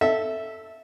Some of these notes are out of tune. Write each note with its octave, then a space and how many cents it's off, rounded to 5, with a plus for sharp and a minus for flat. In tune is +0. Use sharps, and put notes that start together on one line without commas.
A4 +5 E5 -15